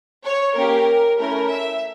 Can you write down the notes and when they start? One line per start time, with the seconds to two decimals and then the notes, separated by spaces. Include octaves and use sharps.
0.24 C#5
0.55 A#3 C#4 G4 A#4
1.18 A3 C#4 E4 A#4
1.50 E5